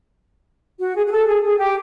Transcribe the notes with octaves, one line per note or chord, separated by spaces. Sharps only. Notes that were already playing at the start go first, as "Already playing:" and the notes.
F#4
G#4
G#4
A4
G#4
G#4
G4